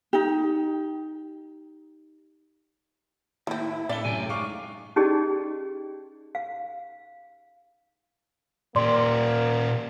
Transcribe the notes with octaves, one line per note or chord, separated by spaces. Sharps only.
D#4 G4
A2 D#3 A#3 C4 E4
A2 C4 D4 E4 A4 D5 E5 G7
F#2 C3 A3 G5 G#5
G#3 D4 D#4 F5 C#6 D6
C#4 D#4 G4 G#4 D5 D#5
F5
A#2 A#3 G4 D5 C6